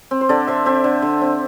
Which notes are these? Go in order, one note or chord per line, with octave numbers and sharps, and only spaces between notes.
C4
C5
D3 A4 D5
D3 C5 E5
C4 C5 E5
D3
D3
C4